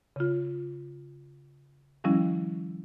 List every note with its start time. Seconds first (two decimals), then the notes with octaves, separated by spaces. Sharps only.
0.16 C#3 F4
2.04 D#3 F3 G3 C#4 E4